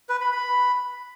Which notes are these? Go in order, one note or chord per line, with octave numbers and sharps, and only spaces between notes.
B4
B5
B5